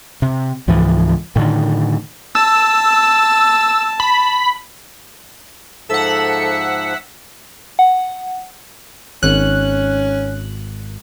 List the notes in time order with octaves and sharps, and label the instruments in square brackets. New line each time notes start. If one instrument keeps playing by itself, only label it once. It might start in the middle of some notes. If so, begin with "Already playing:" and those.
[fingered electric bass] C3
C#2 G#2 E3 F3
A2 D3 D#3
[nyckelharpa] A5 [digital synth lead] E6
[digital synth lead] B5
[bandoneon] G#2 F3 [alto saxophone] A4 [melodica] E5 [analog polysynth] F#5 E6
[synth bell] F#5
[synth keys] G#1 F#6 [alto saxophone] C#4